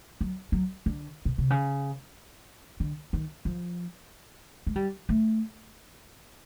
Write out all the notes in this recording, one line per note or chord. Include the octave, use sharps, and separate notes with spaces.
F#3
F#3
D3
B2
C3
C#3
D3
D#3
F3
G#3
G3
A3